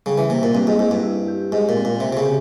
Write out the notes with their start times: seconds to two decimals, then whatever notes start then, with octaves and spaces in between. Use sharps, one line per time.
0.06 C#3 G3
0.18 E3
0.30 C3 A#3
0.43 A#2
0.55 G2 C4
0.67 G#2
0.78 G#2 E4
0.91 G2
1.03 E4
1.28 G4
1.52 G#2 G#3
1.69 A#2
1.77 C4
1.85 A#2
2.00 C3 C4
2.13 C3
2.17 C#3
2.25 G4